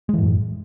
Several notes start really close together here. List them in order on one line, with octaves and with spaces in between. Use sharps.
G#3 E3 A2 F#2